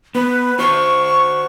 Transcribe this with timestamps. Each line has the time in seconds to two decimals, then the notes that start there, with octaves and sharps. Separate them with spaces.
0.15 B3 B4
0.59 F#4 C5 C#6